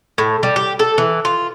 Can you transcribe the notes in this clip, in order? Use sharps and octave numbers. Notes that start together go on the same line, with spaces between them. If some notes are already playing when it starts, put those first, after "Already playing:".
A2
G3
G4
A4
E3
F4